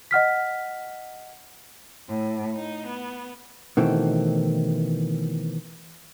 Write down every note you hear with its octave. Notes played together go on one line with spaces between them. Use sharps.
D#5 F#5 F6 B6
A2
D#4
B3
B2 D#3 E3 A3 C4